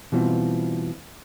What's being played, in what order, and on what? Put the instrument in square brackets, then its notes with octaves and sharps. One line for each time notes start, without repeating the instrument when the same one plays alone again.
[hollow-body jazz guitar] B2 E3 G3 C4 F4